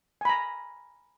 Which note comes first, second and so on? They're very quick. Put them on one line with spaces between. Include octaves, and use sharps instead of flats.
G#5 B5 A#5